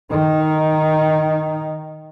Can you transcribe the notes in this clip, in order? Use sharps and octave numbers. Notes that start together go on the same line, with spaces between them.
D#3 D#4